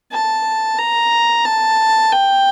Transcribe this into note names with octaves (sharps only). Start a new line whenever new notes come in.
A5
A#5
A5
G5